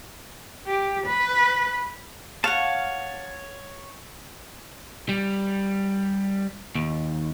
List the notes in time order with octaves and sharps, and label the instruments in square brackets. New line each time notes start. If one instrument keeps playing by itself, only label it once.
[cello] G4
B4
[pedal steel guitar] C#5 A5 [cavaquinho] F5 F#5
[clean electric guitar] G3
D#2